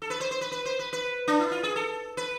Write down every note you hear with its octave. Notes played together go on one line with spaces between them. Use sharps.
A4
B4
C5
C5
B4
B4
C5
B4
B4
D4
E4
F4
G#4
A4
B4